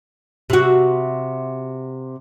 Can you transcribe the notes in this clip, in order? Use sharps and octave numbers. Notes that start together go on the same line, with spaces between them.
C3 F#4